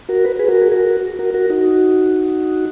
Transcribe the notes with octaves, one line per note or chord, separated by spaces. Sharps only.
F#4 A#4
B4
G#4 B4
F#4 A#4
G#4
F#4 A#4
F#4 A#4
F#4 A#4
D#4 F#4